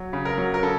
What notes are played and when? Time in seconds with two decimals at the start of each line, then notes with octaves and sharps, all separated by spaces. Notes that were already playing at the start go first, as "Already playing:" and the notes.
Already playing: F#3
0.13 C#3
0.25 A#4
0.38 F#3
0.54 A#4
0.63 C#3 A4